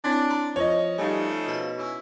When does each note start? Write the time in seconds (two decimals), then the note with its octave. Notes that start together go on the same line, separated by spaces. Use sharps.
0.04 C4 D4 E4 C#5
0.30 A#5 C6
0.56 F3 C#5 D#5
0.98 C#3 F3 G3 A3 D#4 G#5
1.48 B2
1.78 C#4 E4 F#4